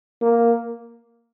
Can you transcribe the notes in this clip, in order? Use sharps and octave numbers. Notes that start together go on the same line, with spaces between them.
A#3